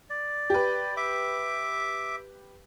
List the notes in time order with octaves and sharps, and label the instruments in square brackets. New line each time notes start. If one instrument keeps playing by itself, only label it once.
[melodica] D5
[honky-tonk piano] G4 B4
[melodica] E5 D6